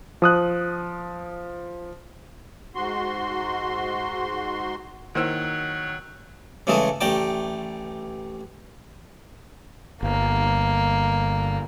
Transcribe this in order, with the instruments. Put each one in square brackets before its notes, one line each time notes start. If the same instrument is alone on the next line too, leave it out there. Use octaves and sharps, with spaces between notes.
[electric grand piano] F3 D#6 F#6
[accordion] G#2 F#4 C6
[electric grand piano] D#3 E6 [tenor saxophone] F#3 [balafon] A#3 E4 C5
[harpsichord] C#3 E3 G#3 A3 G#4 A4
A1 A3 D5 G5 A#5 D6
[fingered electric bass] G1 [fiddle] A#3